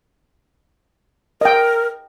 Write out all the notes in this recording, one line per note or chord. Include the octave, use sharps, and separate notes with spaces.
A#4 D#5 G5